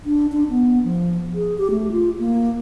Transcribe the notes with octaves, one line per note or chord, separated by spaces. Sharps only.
D4
D4
B3
F3
G#4
G4
A3
F4
A#3